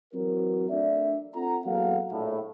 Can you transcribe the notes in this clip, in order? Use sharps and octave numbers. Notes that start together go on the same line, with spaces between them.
E3 F#3 C4 F#4 A#4
A3 D4 D5 E5
C4 F4 A4 F#5 A#5
E2 F#3 A#3 A4 F5 F#5
A#1 A2